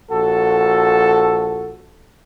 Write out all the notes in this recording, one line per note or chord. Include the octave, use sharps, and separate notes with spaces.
A#1 F#4 A4